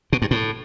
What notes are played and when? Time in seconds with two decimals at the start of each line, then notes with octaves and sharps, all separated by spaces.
0.13 B2
0.22 G2
0.31 A2